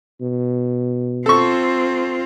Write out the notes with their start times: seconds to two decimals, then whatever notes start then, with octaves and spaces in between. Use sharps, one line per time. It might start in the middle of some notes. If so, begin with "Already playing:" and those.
0.21 B2
1.26 C4 F4 A4 C#6